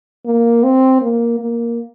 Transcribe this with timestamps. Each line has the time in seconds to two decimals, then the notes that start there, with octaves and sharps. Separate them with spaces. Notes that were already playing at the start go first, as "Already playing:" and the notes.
0.26 A#3
0.64 C4
1.02 A#3
1.39 A#3